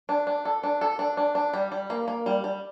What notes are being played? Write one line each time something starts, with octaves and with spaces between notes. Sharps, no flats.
D4
D4
A4
D4
A4
D4
D4
D4
G3
G3
A#3
A#3
G3
G3